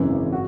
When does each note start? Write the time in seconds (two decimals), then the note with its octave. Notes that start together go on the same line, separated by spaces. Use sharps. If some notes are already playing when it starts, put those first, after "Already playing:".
Already playing: G#1 F#2 C#3 E3
0.33 F#4